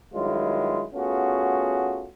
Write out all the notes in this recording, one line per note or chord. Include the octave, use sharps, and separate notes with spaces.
G2 D#3 F#3 G#3 E4 F4
A3 B3 C#4 F4 F#4 G#4